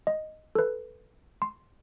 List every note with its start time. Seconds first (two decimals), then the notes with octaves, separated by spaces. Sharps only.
0.07 D#5
0.55 A4 B4
1.42 C6